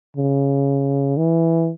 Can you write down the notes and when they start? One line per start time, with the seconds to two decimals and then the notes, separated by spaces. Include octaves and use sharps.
0.17 C#3
1.18 E3